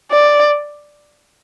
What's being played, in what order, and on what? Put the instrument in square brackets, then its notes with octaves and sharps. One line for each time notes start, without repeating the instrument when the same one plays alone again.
[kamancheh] D5